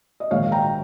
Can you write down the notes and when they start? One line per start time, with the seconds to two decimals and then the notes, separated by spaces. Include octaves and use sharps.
0.20 D#5
0.31 A#1 G#2 D#3 C#5 F5
0.52 G5 A#5